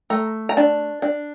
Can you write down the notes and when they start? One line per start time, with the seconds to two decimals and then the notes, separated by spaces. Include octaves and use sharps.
0.10 A3 A#5
0.49 A#5
0.57 D4 A5
1.02 D4